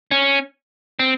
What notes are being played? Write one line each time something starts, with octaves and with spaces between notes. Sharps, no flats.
C#4
C4